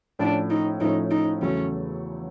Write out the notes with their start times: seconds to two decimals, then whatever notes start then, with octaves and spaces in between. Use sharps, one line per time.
0.19 A2 F3 A3 C#4 D4
0.50 D#4
0.80 A2 F3 A3 C#4 D#4
1.11 D#4
1.41 E2 C#3 F#3 A3 C#4